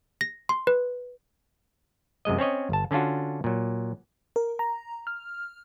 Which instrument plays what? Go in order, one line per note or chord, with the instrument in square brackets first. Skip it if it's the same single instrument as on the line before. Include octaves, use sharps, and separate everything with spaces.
[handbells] A#6
C6
B4
[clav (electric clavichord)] F#2 C3 G#3 D#5
C4 C#4 C#5 D#5
G1 A5
D3 C#4 D4 F4 F#4
A#2 F#3
[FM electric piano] A#4
A#5
F6